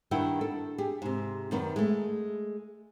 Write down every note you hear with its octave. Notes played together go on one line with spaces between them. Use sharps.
G2 D#3 E4 F#5 G5
A4
G4 G#4
G#2 C3
F#2 D#3 B3
G#3 A3